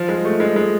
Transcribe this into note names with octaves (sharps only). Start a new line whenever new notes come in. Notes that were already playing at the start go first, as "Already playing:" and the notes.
Already playing: F3
G#3
A3
G#3
G#3